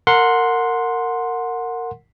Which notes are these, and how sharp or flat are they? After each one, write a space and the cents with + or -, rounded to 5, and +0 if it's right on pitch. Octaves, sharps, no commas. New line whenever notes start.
A#4 -20 F#5 -15 C6 +0